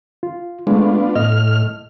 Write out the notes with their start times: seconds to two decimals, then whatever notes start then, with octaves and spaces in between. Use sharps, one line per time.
0.23 F4
0.67 G#3 A3 B3 D4 F4
1.16 A2 D#5 F6